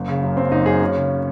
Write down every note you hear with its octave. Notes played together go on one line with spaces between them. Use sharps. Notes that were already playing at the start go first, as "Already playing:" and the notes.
Already playing: F#1
C#3
F#2
F#1 C4
F#1 D#4
F#2 G#4
C#3 C#4
C#3